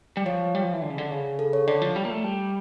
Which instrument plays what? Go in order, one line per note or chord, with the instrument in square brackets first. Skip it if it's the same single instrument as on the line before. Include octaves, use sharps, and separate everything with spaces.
[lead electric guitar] G3
[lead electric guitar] F3 [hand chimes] C#5
[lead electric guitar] G3
F3
E3
D3
C#3
D3
C#3
[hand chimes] A4
C#5
[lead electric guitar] D3 [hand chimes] D5
[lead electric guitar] F3
G3
A#3
A3
G3